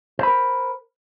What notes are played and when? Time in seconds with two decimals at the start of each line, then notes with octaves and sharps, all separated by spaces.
0.19 C5
0.23 B5
0.27 A#4